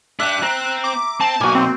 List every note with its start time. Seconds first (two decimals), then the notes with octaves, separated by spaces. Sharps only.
0.20 D4 G4 E5 F#6
0.42 C4 A#5
0.84 D6
1.21 C4 A5
1.41 B1 A#3 F#4 G#5
1.55 C4